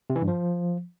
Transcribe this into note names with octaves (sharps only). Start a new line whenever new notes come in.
C3
E3
G2
F3